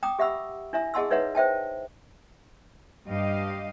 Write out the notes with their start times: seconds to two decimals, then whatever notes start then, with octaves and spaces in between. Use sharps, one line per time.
0.03 G5 A#5 D6 D#6
0.19 G4 E5 F#5 B5 E6
0.73 D4 E4 E5 A#5
0.94 G#4 D#5 F#5 A5 C6 E6
1.11 D#4 B4 C#5 E5 F#5 A#5
1.35 C5 E5 G5 A5
3.07 G2 G4 D#5 F5